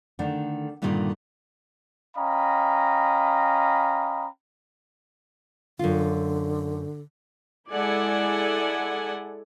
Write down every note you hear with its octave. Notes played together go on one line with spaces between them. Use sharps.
D3 D#3 A3 D4
G2 A#2 D3 D#3 G3
C#4 D#5 F5 G5 A#5 B5
F#2 D3 F4
G#3 E4 A4 D5 F#5 G#5